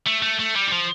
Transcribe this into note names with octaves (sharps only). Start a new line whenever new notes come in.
A3
A3
A3
G3
E3
F3